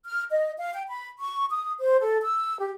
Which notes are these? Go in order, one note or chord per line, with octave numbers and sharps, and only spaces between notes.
F6
D#5
F5
G5
B5
C#6
D#6
C5
A4
E6
G4